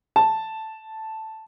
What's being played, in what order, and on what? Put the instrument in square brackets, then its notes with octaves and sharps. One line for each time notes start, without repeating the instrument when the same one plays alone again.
[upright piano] A5